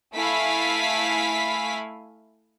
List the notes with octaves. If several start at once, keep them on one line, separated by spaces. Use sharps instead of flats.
A3 E4 F5 G#5 B5 B6